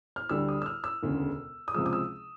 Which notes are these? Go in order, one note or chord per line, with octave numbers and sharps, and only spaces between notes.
F6
D2 D3 G3 E6
D#6
E6
F6
E6
E1 D2 C#3
D#6
C#2 C3 F3 G#3 E6
D#6
E6